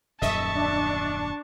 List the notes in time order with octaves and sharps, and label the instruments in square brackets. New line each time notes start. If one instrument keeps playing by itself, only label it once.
[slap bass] D#1 F#2 D#3 [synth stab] D#5 E5 [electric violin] A5 C#6
[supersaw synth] D4